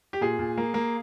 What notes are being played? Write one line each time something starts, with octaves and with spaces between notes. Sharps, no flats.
G4
A#2 G#4
A#2
A#3
A#3